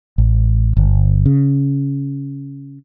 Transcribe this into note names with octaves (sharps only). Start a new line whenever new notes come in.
A1
G1
C#3